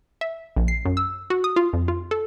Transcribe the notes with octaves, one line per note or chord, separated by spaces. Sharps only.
E5
A#1
C7
F#2
E6
F#4
D#6
F4
F2
F4
A4